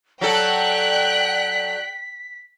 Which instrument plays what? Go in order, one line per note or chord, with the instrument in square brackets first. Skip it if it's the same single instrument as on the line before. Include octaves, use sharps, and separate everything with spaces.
[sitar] F#3 A4 [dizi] D5 [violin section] G5 F#6 [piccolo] B6